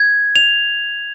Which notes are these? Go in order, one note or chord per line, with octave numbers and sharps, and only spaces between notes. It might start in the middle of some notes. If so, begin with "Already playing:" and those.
Already playing: G#6
F7